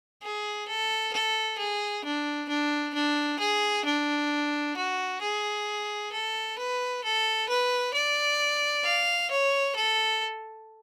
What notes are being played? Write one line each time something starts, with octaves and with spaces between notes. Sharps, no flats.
G#4
A4
A4
G#4
D4
D4
D4
G#4
D4
F#4
G#4
A4
B4
A4
B4
D5
F5
C#5
A4